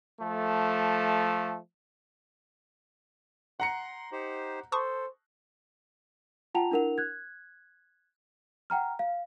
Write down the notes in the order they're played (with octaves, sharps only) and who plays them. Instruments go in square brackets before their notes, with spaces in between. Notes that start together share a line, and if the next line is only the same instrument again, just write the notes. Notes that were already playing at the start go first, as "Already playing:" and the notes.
[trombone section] F3 A3
[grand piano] F#5 A#5 C#7 [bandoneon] C6
[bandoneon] D#4 G4 C5
[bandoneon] A4 [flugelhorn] C5 [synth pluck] A5 C#6 D#6
[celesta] F4 F#5 G5 A5 A#5 F7
D4 E4 A#4 F#5 F7
F#6 G#6
F#5 G5 A#5 F6
F5